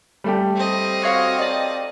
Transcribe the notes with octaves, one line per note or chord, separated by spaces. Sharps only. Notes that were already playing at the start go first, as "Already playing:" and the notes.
G3 A3 G4
C4 D#5
F#4 C#5 F5
D#4 D5